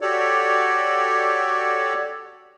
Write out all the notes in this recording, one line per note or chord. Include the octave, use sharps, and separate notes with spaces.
F#4 G4 A4 C#5 D5